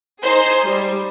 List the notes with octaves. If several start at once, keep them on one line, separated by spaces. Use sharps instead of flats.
D#4 G#4 C5
G3